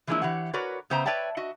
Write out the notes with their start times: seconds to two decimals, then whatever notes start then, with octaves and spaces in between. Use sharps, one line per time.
0.07 E3 F3 G#3 A#3 D4 E4
0.22 E3 G4 C#5 F#5
0.53 F#4 A#4 B4 C#5 D5
0.90 C#3 B3 C5 E5 G5 A#5
1.05 B4 C#5 D5 E5 G5 A5
1.37 F#4 D#5 E5